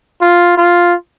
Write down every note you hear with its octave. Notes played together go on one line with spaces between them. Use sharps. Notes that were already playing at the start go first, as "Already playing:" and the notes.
F4
F4